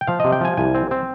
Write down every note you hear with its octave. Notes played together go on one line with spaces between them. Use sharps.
G5
F3 F5
C3 D#5
G5
F3 G#5
C2 G#5
C4
C4